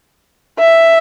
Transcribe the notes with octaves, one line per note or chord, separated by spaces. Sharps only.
E5